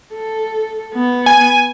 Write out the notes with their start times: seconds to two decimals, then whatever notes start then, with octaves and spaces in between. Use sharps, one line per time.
0.14 A4
0.94 B3
1.26 G#5